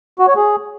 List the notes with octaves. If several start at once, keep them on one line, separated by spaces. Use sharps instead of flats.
F#4
C#5
G#4